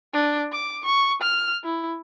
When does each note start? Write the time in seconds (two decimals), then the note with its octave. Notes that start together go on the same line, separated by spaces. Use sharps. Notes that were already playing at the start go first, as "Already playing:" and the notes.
0.14 D4
0.52 D6
0.85 C#6
1.21 F6
1.64 E4